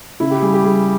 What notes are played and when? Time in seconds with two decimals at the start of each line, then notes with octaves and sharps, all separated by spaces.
0.20 C#3 E4
0.31 G4
0.42 G3 G#4
0.54 G4
0.64 G3 G#4